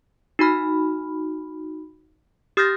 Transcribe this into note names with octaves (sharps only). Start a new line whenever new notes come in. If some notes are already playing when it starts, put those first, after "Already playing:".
D#4 F#4 B5 F6
G4 D#6 F6 G6 A6 A#6